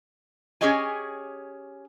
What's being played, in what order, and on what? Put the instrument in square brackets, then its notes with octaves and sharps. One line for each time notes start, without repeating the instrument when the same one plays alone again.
[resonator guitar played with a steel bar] C#4 G4 G#4 C#5 D#5 G#5